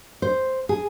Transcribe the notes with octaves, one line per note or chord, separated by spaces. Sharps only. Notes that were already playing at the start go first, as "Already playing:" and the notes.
C5
G#4